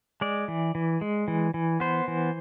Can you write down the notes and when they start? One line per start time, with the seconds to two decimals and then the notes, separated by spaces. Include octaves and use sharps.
0.21 G#3 D5
0.48 E3
0.75 E3
1.01 G#3
1.28 E3
1.54 E3
1.80 B3 C5
2.08 E3